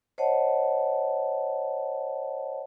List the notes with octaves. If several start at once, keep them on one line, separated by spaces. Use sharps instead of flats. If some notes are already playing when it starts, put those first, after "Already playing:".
C5 C#5 D#5 F#5 A5